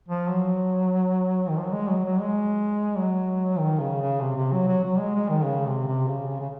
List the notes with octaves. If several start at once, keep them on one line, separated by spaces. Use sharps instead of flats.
F3
F#3
D#3
F3
F#3
G#3
F#3
F#3
G#3
F#3
D#3
C#3
C#3
C3
C3
F#3
F#3
F#3
G#3
G#3
D#3
C#3
C3
C3
C#3
C#3
C#3